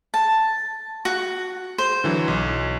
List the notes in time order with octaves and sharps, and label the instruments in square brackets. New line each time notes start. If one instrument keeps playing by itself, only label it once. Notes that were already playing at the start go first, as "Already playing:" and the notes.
[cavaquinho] A5
F#4
C5
[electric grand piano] D3 E3 F#3
B1